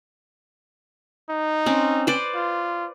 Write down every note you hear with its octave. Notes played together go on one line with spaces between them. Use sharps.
D#4
C4 C#4
B4 C5 D5
F4